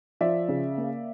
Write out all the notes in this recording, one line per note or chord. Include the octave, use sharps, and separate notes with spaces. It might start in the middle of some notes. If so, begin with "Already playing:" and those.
F3 D5 E5
C#3
A#3